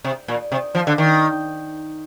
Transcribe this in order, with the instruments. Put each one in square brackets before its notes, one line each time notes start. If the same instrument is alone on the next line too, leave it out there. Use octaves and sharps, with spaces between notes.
[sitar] C3
A#2
C3
F3
D3
D#3